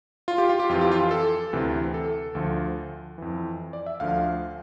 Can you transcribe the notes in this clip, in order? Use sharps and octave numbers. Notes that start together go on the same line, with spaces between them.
F4
G4
F4
G4
F2 E3 F4
G4
F4
A4
D2 C3 E3
A4
D2 D3 F3
F2 E3
D5
E5
D2 D3 F3 F5